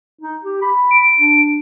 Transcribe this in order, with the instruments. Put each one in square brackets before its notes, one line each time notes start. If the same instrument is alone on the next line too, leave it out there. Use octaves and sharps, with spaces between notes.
[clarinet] D#4
G4
B5
[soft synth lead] D7
[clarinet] D4